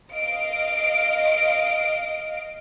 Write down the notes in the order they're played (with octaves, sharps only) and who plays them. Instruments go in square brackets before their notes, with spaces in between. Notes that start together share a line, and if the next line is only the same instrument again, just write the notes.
[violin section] D#5 F5 D7